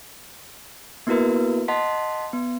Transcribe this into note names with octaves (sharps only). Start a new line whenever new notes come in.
A#3 B3 E4 F#4 A#4 B4
D#5 F#5 A5 C6 B6
B3